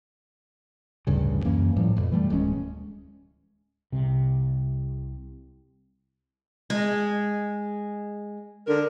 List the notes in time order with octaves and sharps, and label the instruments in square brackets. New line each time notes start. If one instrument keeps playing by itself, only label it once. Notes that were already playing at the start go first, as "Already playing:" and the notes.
[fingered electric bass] A1 D2 G2 C#3
F#2 E3 A#3 C#4
A2 F3 G3
A1 F2 B2
E3 G3 A3
D1 G3 G#3 C#4
[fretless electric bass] C2 C3
[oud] G#3
[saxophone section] D3 A#4